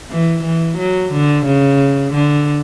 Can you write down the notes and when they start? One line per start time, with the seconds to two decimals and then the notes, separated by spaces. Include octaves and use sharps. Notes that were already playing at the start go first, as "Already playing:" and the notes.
0.10 E3
0.43 E3
0.77 F#3
1.12 D3
1.46 C#3
2.13 D3